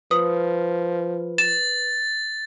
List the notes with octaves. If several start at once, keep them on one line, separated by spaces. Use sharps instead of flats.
F3 B4 D#6
A6 E7